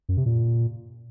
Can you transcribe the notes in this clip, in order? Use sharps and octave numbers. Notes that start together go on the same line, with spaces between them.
F#2
C3
A#2